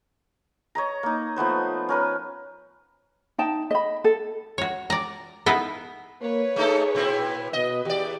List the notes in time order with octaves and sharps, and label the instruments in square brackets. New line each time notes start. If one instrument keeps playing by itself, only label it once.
[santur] C#5 D#5 A#5
A#3 D#4
F3 A3 B3 C5
C#4 A#4 B4
[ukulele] D#4 G5 A5
D#5 B5
A4
[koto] F#4 C#5
D5 A#5
B3 D#4 E4 A4 B4 F5
[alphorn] A#3 [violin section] B4 C#5
[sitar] A3 D#4 A4 [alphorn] G#4
[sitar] A#2 C4 E4
[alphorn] B2 [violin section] B4 [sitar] D#5
[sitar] E2 D5 [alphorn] G4